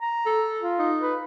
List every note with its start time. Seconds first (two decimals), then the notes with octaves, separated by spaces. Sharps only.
0.01 A#5
0.26 A4
0.61 F4
0.79 D#4
1.01 B4